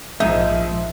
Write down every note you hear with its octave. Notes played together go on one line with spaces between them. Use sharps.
A#1 G#2 F3 D#4 E5